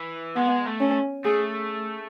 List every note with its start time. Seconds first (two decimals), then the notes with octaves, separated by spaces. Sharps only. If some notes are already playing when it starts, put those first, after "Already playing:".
Already playing: E3
0.36 G#3 B3
0.66 A3
0.80 C#4
1.25 A3 G#4